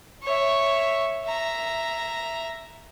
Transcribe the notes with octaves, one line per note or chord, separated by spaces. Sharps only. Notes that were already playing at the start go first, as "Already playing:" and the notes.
C#5 E5
E5 A#5